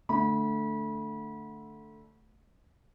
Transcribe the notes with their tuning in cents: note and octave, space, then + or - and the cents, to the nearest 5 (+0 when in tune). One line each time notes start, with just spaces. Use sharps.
D3 +0 A3 +0 B5 -30